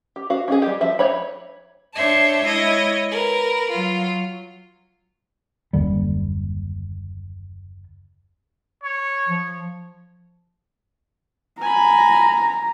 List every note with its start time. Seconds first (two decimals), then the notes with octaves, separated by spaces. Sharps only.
0.16 G4
0.30 F#4 F5
0.48 C#4 D#4 G#4
0.62 G3 G4
0.81 F3 E5
0.99 D#4 C#5 B5
1.95 D4 C5 C#5 E5 A5
2.45 G#3 E4 C#5 D#5
3.11 A#4 B4
3.71 F#3 F4
5.73 F#1 D#2 D3 G3
8.84 C#5
9.29 F3
11.61 G#5 A#5 B5